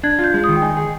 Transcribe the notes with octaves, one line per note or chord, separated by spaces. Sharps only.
D4 G#6
F4
G6
G#3
D#3 D#6
G5
D#4 G#5
G#4